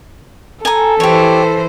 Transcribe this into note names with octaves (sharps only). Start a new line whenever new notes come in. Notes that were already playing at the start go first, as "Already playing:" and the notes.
A4 G#5 A#5
E3 G4 C5 C#5